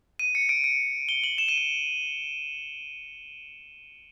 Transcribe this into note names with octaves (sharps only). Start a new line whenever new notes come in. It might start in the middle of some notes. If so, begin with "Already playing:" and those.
D#7
C#7
D7
D7
G7
F#7
E7
D#7
E7